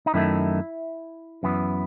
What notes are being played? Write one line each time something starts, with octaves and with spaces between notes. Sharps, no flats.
D#4
F#2 D#3 A3 E4
F#2 E3 B3